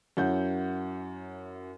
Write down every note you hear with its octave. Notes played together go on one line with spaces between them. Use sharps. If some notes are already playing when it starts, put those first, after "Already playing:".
F#2 C#4 E4 F#5 G6